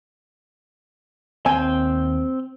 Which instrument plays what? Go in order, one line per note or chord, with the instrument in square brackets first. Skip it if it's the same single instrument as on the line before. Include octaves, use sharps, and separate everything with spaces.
[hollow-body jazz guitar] D#2 G#5 [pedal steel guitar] C4 G5